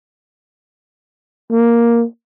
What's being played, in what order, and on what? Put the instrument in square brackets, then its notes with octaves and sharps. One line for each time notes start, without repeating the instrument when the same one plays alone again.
[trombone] A#3